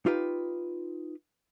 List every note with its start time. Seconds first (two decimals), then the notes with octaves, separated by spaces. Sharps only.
0.06 D#4 F4 G4 B4